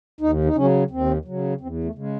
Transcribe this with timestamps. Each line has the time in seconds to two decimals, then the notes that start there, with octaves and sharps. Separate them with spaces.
0.21 D#2 D#4
0.45 D#4
0.55 C#3 F#3 C#4
0.90 D#2 C4
1.25 C#3 F#3
1.61 E2 C4
1.84 A3
1.95 C#3 G#3